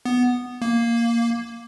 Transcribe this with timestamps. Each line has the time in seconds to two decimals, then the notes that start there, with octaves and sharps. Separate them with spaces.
0.05 B3
0.62 A#3